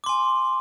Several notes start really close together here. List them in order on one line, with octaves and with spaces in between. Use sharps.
D6 C6 G#5